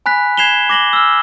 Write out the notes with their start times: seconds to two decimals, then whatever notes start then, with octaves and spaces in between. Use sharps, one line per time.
0.06 G#5 B5 F#6 B6
0.37 G#6 C7 E7 F7 G7
0.70 D6 A#6 F#7 G7
0.93 E6 F6